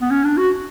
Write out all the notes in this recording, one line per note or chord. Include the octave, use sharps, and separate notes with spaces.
B3
C#4
D4
F#4